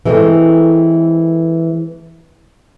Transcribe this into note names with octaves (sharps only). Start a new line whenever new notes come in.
E3 G#3 A3 C4